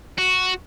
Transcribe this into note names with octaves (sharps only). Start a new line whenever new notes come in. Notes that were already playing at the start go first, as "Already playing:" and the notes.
F#4